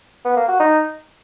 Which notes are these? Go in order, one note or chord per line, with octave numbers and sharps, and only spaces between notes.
B3
A#3
F#4
D#4